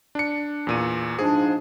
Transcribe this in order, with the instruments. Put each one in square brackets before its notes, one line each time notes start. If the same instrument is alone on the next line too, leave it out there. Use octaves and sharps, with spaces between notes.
[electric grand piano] D4 C#7
E2 A#2 D#7
[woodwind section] G#2 F3 D4 [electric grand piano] G#4